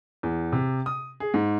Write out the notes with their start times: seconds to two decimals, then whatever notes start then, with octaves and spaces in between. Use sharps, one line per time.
0.23 E2
0.52 C3
0.86 D#6
1.20 G#4
1.34 G#2